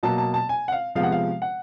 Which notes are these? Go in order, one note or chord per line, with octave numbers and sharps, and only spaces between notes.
B2 F#3 A#3 A5
A5
A5
G#5
F#5
F5
C3 F3 G#3 B3 F5
F#5
F5
F#5